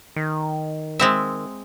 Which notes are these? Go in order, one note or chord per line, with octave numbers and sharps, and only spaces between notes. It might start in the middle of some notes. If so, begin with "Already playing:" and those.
D#3
G#3 C4 E5